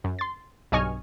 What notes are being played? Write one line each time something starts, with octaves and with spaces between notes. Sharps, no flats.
F#2
C6 A6
B1 G2 D#5 G#5 C#6 F6